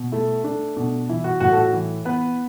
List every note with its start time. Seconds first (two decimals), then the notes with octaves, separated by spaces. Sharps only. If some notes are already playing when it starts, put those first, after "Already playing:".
Already playing: B2
0.12 A3 E4
0.44 A3 D4
0.77 B2 D4
1.09 E3 E4
1.24 F#4
1.40 A2 F#4
1.52 A4
1.56 F#4
1.73 E3
2.05 B3 B4